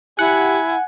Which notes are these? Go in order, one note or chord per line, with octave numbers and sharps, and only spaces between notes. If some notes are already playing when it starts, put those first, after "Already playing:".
E4 G4 F#5 G#5